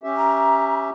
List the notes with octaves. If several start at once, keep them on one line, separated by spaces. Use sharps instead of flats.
C#4 G4 E5
A#5